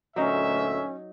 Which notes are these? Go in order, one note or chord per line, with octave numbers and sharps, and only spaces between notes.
D2 A#2 F#3 C#4 D#4 E5